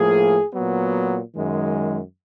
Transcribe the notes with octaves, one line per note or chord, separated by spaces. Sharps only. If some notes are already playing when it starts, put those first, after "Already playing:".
Already playing: A2 F3 A#3 G#4
A#2 F#3 B3
F#2 D#3 G#3